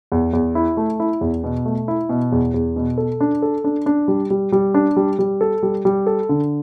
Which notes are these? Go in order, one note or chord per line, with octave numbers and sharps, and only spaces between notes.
E2
E2
E4
A3
E4
E2
B2
A3
E4
B2
E2
E2
B2
A4
D4
A4
D4
D4
G3
G3
G3
D4
G3
G3
A4
G3
G3
A4
D3